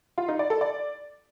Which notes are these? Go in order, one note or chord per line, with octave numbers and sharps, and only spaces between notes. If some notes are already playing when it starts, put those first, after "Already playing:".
F4
D#4
D5
A4
D5